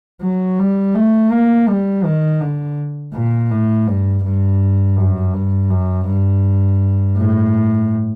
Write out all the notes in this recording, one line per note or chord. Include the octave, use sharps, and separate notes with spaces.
F#3
G3
A3
A#3
G3
D#3
D3
A#2
A2
G2
G2
F#2
G2
F#2
G2
A2